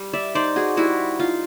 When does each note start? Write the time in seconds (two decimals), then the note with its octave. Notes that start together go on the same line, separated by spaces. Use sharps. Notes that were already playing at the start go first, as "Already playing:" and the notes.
Already playing: G3
0.13 D5 E5
0.35 D#4 C5 D5
0.56 F#4 G#4
0.77 G3 E4 F#4
1.19 D#4 F4